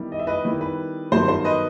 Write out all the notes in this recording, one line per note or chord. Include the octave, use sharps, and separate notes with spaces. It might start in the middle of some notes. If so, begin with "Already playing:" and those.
Already playing: D#3 G3 B3 E4
D#5
E5
B4 D#5
D#3 G3 B3 E4 B4
B4
G2 D#3 F#3 B3 C5
C5
B4 D#5